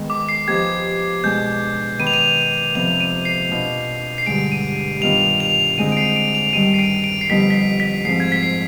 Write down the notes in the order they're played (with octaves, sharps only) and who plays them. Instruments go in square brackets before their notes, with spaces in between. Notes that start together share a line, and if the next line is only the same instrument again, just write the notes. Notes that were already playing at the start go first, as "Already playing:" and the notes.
Already playing: [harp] D#3 G#3 B3
[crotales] D6
C7
[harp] F3 B3 D#4 G4 C5 [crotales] G#6
[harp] B2 G#3 D4 [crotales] G6
[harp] D#3 B3 D#4 B4 [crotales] D#7
[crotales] F7
D#7
[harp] F2 C3 F3 B3 [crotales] F7
[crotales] D#7
C7
[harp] B2 B3 D4 F4
[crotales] C7
[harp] G2 D3 G#3 [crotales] D7
[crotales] D#7
[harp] G2 D#3 B3 D4 F4 [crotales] F7
[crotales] F7
[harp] D3 G#3 C4 D#4 [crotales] D#7
[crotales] D7
C7
D7
F7
[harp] G2 D#3 G3 [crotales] D#7
[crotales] C7
D7
D7
C7
[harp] F2 D3 G3 B3 D#4 [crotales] B6
[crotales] B6
C7
B6
[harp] G#2 F3 C4 [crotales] C7
[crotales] G#6
B6
C7